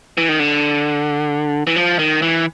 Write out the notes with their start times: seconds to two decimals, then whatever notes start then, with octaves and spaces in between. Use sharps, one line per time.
0.18 E3
0.29 D#3
0.39 D3
1.67 E3
1.76 F3
1.99 D#3
2.22 E3